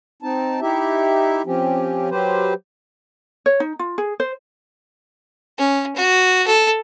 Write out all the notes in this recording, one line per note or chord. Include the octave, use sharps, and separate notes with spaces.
C4 D#4 A5
D#4 E4 G4 E5
F3 C4 C#4 G4
F#3 G4 B4 C5
C#5
D#4
F4
G#4
C5
C#4
F#4
A4